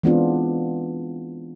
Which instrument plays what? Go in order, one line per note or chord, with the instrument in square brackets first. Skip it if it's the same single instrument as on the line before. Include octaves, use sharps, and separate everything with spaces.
[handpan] E3 G#3 B3 C4 D4 F4